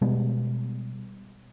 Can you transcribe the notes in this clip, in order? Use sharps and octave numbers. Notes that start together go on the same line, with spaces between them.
B2 G3 G#3 B3